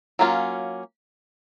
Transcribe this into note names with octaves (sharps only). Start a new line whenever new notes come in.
F#3 A#3 C#4 F4